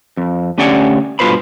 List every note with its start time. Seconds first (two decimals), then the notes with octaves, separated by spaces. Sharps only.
0.17 F2
0.58 D2 C#4 G4 D5 F#5 G#5
1.19 G2 B2 F4 B4 C5 B5